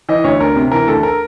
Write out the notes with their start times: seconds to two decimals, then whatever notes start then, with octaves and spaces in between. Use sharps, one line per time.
0.09 E3 D#5
0.24 D2 C#5
0.40 D2 A#4
0.56 C3
0.72 E3 A#4
0.88 D2 A4
1.03 A#4